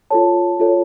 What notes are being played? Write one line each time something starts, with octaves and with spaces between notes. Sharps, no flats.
F4 A4 C#5 A5
F4 A4 C#5